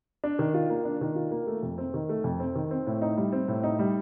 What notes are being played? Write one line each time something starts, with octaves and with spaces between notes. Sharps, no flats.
D4
D#3
F4
A#3
D4
D#3
F4
A#3
A3
F2
C4
D#3
A3
F2
C4
D#3
C4
A2
D#4
G3
C4
A2
D#4
G3